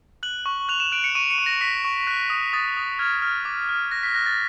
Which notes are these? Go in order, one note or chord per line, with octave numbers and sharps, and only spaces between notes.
F#6 F#7
C#6
F#6 F7
E7
F#6 D7
C#7
C#6 D#7
C#7
C#6
A#6
C#6 B6
C#6
F#6 B6
D#6
D#6 A6
D#6
F6 G#6
F6
D6
F6
F#6 A#6
B6
F#6 A#6
A6